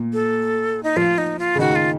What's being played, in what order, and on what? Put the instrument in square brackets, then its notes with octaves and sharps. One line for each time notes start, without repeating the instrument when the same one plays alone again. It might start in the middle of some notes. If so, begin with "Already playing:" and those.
Already playing: [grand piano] A#2
[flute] A4
D#4
[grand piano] F3 [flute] F4
[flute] D#4
F4
[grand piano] C#3
[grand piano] D#3 [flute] F#4
[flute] F4